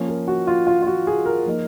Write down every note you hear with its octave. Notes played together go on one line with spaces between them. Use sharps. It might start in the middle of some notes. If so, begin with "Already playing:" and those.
Already playing: F3 A#3 C#4
A#4
F#4
F4
F4
F4
F#4
G#4
A#4
F3 A#3 D#4